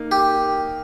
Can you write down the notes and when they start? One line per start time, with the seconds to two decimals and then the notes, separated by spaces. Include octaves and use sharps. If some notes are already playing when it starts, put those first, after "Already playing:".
Already playing: A#3 D#4
0.11 G4